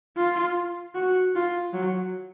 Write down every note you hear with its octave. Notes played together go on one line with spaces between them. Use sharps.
F4
F#4
F4
F#3